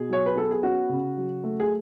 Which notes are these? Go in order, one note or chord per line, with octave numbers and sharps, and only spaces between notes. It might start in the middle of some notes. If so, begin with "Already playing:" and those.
Already playing: B2 G#4
F#3 C#5
B4
B3 A4
G#4
C#4 F#4
C#3
F#3
A3
G#4